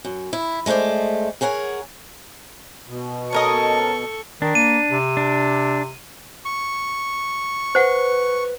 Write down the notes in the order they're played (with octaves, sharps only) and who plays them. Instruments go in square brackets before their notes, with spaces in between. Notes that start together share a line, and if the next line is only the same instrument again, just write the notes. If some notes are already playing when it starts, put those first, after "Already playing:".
[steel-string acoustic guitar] F#2
E4
G#3 A3 B3 C5 D5
G#4 A#4 C#5 F#5 G#5
[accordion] B2
[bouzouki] C#4 A#4 D#5 [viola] A4 C#6 [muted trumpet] A5
[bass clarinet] D#3 [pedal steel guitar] D4
[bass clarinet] A#3 [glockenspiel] D#7
[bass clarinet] C3
[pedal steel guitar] D4
[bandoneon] C#6
[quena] B4 [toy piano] C5 F#5